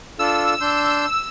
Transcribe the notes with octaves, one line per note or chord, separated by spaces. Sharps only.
D4 F4 A4 E6
D4 C6 G6